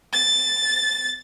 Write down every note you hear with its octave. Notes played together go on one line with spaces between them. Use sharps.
A6